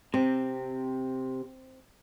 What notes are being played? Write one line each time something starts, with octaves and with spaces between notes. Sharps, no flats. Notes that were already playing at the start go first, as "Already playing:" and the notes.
C3 C4